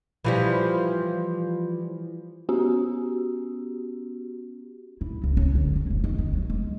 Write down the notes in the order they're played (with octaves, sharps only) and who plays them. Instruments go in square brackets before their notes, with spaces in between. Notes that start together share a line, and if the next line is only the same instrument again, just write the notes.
[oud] E3 F3 G3
[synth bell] B3 C#4 F#4 G4
[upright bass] E4
C#2
C#4
D3
C#4
F1
D#3
D#3
F#3
G#3